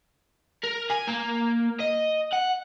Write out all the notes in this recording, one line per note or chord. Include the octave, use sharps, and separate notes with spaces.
A#4
G#5
A#3
D#5
F#5